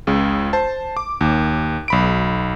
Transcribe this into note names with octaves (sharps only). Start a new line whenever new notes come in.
C#2 C#3
C5 A5
D6
D#2
B1 B5 D7